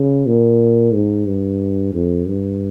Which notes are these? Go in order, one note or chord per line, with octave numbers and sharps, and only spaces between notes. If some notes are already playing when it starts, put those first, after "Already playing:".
Already playing: C#3
A#2
G#2
G2
F2
G2